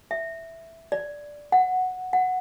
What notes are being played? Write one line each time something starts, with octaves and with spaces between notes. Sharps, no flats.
E5
D5
F#5
F#5